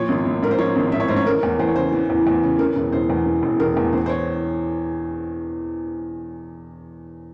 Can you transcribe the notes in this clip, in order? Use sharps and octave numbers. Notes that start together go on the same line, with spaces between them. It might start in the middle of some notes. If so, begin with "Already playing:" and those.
Already playing: A#2 F3 C#5
G#1
G#1
G#2 A#4
C5
F3 C#5
G#1
G#1 E5
C#5
G#2 C5
C#5
E3 A#4
E2
E2 C5
C#5
C#3 C5
E3
E2
E2
C#3
E3 A#4
E1
E1 C5
E2
E3
E1
E1 A#4
E2
E3 C5
C5
C#5